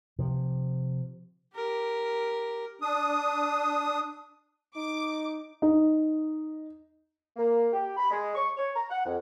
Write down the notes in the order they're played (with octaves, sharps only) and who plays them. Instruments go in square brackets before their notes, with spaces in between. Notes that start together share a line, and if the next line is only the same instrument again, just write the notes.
[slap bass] C3 F3
[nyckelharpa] G4 A#4
[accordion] D4 D#6
[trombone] D#4 [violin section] D6
[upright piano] D#4
[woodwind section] A#3
G4
B5
G#3
C#6
C#5
A#5
F#5
F2